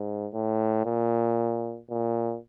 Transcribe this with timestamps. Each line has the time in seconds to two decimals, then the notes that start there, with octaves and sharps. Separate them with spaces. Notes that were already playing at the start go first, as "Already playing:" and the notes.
Already playing: G#2
0.33 A2
0.85 A#2
1.90 A#2